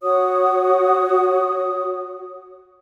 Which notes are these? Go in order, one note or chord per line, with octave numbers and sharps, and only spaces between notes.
F#4 C#5 D#6